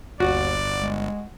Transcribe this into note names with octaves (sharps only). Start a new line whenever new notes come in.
G1 D#2 F#4 D5
G#3